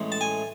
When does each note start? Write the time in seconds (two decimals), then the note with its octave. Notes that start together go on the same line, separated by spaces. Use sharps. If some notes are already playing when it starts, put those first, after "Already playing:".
Already playing: A1 A2 G#3
0.12 A5
0.21 G#5